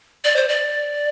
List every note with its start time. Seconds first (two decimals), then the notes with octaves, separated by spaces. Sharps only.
0.24 D5
0.36 C5
0.49 D5